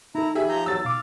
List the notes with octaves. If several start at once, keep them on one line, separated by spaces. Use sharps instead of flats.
D#4 E4 A4 A#5
E3 G4 G#4 E5
F3 A#5 G6
E2 F#3 E6 A6
B2 F5 D6